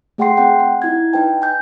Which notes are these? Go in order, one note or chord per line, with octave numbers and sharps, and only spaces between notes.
A3 G#4 F#5 G5 C6 C7
C4 F#5 G5
F#5
D#4 E4 G#6
D#4 B4 G5 A5
G#5 G6